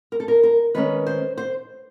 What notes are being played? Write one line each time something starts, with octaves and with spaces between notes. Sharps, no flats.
A#4
A4
A#4
A#4
D#3 G#3 C#4 B4
C5
C5